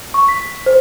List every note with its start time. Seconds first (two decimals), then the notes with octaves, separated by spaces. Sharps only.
0.14 C#6
0.28 B6
0.66 C5